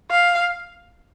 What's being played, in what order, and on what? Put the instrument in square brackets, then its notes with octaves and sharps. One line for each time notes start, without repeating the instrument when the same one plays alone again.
[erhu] F5